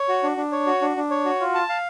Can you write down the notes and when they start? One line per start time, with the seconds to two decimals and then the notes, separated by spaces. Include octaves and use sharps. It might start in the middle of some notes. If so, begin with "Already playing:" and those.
Already playing: C#5
0.09 F#4
0.23 D4
0.37 D4
0.52 C#5
0.67 F#4
0.81 D4
0.97 D4
1.10 C#5
1.25 F#4
1.41 F4
1.55 A5
1.69 F5